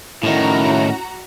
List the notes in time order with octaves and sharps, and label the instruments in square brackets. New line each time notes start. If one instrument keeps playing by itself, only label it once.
[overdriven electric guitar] A2 D#3 [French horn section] C#4 E4 [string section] F#4 A#5